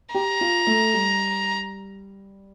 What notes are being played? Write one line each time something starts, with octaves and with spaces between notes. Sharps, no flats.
G4 A#5
F4
A3
G3